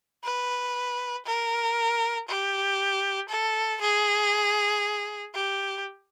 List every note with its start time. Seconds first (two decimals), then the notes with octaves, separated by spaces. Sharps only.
0.24 B4
1.26 A#4
2.28 G4
3.30 A4
3.82 G#4
5.34 G4